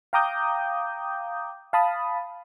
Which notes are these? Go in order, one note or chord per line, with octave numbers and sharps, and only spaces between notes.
F5 G5 A#5 D6 D#6 G6
F5 A5 B5 D#6